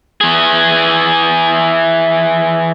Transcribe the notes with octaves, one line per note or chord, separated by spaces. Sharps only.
E3 G#4